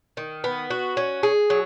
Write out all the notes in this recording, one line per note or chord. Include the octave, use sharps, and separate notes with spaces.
D#3
B3
F#4
C#4
G#4
F#3